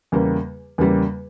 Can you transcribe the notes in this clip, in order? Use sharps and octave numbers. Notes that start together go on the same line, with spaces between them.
E2 C#3 G3 A#3
E2 C#3 G3 A#3